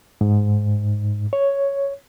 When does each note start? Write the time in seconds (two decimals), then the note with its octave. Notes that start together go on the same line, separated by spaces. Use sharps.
0.21 G#2
1.33 C#5